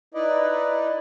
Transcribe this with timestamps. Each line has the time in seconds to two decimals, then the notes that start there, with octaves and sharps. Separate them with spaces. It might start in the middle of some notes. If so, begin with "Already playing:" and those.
0.14 D#4 E4 B4 D5 D#5